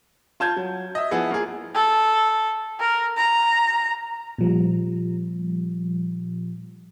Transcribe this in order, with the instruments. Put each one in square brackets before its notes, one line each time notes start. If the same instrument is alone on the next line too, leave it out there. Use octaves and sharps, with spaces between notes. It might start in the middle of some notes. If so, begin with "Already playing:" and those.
[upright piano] F4 A5 G6 G#6
F#3
D#5 E5
F3 B3 E4 G#4
A#3 F4 G#4
[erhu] A4
A#4
A#5
[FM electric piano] A#2 F3 G3